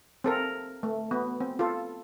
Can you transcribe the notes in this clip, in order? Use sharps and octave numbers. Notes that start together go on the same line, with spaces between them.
C4 A4 A#4
A3
B3
C4
F4 A4